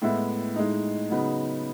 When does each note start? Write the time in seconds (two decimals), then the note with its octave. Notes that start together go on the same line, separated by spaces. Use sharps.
0.02 A2 G#3 B3 E4
0.56 A2 G#3 D#4
1.10 C#3 F#3 B3 D#4